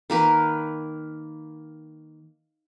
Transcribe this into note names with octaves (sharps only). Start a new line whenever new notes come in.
D#3 A#3 A#4 B4